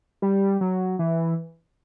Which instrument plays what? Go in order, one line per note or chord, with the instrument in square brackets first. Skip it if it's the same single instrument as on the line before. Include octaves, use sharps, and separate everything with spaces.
[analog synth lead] G3
F#3
E3